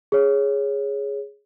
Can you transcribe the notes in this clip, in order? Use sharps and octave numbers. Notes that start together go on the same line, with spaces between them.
G#4 C#5